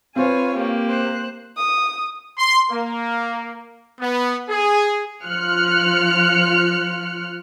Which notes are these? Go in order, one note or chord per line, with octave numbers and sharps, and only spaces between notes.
C4 F4 B4 C#5 G#5
A#3 G4
C5 F#6
D#6
C6
A#3
B3
G#4
F3 F4 F6 F#6 C#7